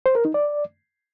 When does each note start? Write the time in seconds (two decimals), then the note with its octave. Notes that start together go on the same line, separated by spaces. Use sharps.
0.06 C5
0.15 A#4
0.25 D#4
0.34 D5